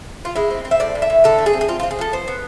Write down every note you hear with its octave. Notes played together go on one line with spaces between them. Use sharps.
F4
G#3 E4
C4
C4
E5
A2 D5
A2
E5
A2
D3 A4
A3
G#4
C4
G#4
C4 F4
C4 F4
G#4
F3 A4
B3 C5
B3